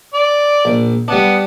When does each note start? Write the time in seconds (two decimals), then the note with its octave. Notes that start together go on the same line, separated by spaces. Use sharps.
0.14 D5
0.65 A#1
1.08 G3 B3 D4